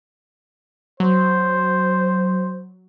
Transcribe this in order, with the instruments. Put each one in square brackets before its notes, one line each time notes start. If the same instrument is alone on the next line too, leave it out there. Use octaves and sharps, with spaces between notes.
[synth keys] F#3 [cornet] C5